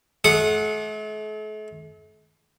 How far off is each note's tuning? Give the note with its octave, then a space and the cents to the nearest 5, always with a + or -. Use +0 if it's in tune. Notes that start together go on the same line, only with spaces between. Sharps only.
A3 -45 F#5 -10 D#6 -25